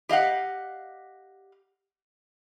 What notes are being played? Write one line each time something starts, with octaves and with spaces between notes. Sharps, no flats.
G4 D#5 F5 F#5